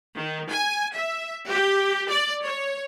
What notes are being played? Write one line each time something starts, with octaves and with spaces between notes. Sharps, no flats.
D#3
G#5
E5
G4
D5
C#5